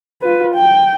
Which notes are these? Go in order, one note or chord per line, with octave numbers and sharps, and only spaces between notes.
F4 B4
G5